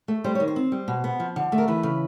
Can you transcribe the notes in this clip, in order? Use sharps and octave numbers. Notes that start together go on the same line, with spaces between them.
A3
G3 C5
D#3 C#5
C5
C4
G3
B2
B3
F3
D3
A3
A#4
E3 B4
C#3